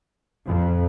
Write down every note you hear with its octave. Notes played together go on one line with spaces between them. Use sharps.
F2